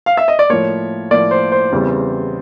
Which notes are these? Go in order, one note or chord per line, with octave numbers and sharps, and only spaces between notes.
F5
E5
D#5
D5
A2 F3 A#3 C#5
A2 F3 A#3 D5
C5
C5
E2 C#3 E3 G3 C4